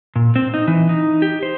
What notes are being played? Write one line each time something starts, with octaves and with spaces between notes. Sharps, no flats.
A#2
C4
D#4
E3
D#4
G4
C5